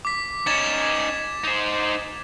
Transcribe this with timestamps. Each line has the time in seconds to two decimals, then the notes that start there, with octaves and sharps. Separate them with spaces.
0.05 D6 B6
0.47 C#4 D#4 G#6 A6 E7
1.44 D#4 C5